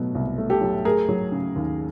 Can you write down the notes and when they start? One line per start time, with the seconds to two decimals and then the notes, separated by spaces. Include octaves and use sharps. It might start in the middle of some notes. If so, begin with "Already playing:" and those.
Already playing: B2 F#3 A3
0.15 C2
0.38 A3
0.50 G4 A4
0.62 F#3
0.85 A3 G#4 A#4
1.09 F#3
1.32 C#3
1.56 D#2